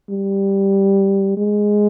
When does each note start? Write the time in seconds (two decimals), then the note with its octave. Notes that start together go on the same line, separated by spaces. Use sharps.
0.10 G3
1.37 G#3